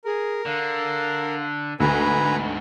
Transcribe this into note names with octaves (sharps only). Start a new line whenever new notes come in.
G#4 A#4
D3 F5
D2 G#2 B2 B4 G#5 A#5 B5